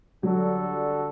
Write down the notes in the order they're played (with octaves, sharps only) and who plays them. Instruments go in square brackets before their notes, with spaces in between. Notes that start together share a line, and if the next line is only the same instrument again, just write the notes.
[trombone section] D3 G3 D4 F#4 A4 [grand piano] F#3